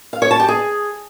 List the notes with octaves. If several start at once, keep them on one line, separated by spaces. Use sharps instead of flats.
F5
C#5
A5
G4
G#4